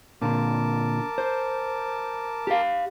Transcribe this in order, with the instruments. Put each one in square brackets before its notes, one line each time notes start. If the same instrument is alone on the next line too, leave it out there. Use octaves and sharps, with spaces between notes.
[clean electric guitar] A#2 D3 [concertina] A#4 A5 D6
[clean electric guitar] C5
G4 F5